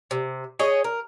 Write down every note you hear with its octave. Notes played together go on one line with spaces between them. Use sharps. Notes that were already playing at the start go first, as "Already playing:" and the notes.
C3
G#4 C#5 D#5
A#4